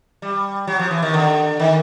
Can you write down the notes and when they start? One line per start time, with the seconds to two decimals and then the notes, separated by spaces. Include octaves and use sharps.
0.22 G3
0.67 F#3
0.79 F3
0.91 E3
1.02 D#3
1.14 D3
1.60 D#3